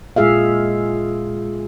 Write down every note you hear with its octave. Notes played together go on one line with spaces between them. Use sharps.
A#2 G#3 F4 G#4 E5 F5